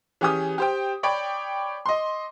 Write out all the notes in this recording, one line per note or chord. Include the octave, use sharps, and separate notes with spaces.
E3 C#4 G4 G#4 D#6
G4 C5 G5
C#5 D5 G5 B5 D6
D#5 C6